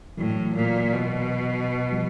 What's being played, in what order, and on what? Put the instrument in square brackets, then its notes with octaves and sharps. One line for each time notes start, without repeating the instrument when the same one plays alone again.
[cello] A2 [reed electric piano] E3 F#3
[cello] A#2
B2
[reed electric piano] F3 G3